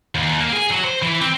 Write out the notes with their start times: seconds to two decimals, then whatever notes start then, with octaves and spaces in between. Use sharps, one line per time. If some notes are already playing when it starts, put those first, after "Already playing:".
0.15 D#2
0.40 A#3
0.53 G#4
0.71 F#3
0.84 C5
1.02 E3
1.21 C4